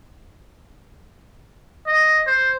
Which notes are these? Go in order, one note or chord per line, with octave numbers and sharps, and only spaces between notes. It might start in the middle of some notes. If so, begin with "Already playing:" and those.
D#5
C5